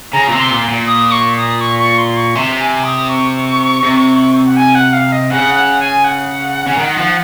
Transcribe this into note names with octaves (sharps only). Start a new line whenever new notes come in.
C#3 A#5
A#2
C3
C6
A#2
A#2
D#6
C#6
D#6
C#6
C#6
C6
C#6
C3 C6
G#5
D#6
C#6
C3
F#5
G#5
F#5
F5
D#5
C#3 F#5
F#5
G#5
F#5
C#3
D#3
F3